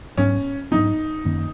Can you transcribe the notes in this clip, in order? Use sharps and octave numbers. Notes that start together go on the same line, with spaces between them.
G#2 F#3 B3 C#4
G#2 F#3 B3 D#4
F#2 D#3 A#3 C#4